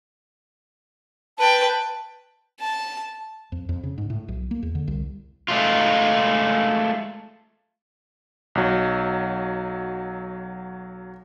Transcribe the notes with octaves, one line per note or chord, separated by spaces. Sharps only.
B4 G5 A5
A5
F2
F2
C#3
G#2
A2
B1
A#3
E2
D3
C2
G#3 A3 F4
B1 F#3